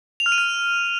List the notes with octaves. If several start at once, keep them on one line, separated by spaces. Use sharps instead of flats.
F7
F6
D#7
F6